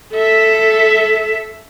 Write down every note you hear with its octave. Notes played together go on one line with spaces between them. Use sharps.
A4 E5